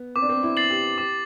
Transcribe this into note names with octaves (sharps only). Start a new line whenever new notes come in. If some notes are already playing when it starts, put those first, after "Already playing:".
Already playing: B3
C4 D6
D4
C4
E4
A6 C7 F#7
G4
G4 D6